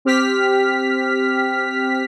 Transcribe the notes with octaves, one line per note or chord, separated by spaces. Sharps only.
C4 G4 F6 B6